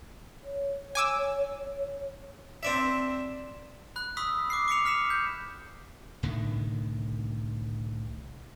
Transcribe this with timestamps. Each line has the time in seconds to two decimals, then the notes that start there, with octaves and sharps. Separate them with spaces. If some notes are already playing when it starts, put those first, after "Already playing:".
0.44 C#5
0.95 G#5 D6 E6
2.63 C4 D4 E5
3.96 B5 F#6
4.17 B5 C#6 D#6 E6 B6
4.50 D6 F#6 C7
4.68 D6 B6 C#7 F7
4.85 F6 B6 C#7 E7
5.10 G6
6.23 C2 A2 D3 D#3